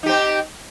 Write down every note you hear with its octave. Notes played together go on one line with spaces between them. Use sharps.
C4 D#4 G4